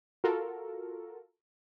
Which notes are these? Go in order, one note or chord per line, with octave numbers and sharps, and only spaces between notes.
F4 F#4 A4 A#4